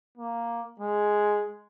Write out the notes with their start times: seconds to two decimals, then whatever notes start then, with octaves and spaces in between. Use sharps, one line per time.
0.18 A#3
0.80 G#3